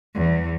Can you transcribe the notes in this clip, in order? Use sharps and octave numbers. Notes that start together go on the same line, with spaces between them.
E2